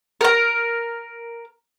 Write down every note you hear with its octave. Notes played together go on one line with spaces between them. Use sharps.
A#4 A#5